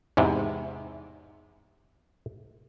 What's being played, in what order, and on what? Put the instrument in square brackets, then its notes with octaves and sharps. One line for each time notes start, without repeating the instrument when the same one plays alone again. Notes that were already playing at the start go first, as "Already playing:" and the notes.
[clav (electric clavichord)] E2 G#2 C3